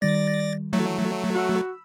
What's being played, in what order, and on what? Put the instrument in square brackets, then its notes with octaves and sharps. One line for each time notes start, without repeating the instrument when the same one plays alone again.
[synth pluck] D#3 G3 [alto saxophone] D5 [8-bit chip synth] A6 A#6
[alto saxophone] E3 [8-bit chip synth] F#3 A3
[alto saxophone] F#4 [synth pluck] B5 E6